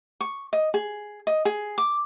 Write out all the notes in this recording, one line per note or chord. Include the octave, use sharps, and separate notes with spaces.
C#6
D#5
G#4
D#5
G#4
D6